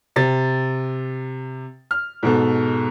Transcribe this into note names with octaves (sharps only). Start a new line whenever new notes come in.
C3 A6
F6
G#2 B2 A4